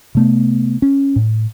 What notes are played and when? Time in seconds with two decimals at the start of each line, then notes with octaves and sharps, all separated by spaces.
0.15 C3 A3 B3
0.82 C#4
1.16 A2